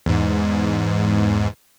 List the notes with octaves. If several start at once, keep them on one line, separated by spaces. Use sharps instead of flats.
E2 G#2